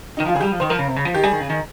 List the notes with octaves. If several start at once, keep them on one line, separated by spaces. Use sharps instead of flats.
D#4
D#3
F3 F4
C#3 G#4
G3 G4
F3
D#3 C5
F3 A#4
C#3
C3
C#3
F3
D#3 G4
G3 G#4
D#3
C#3
D#3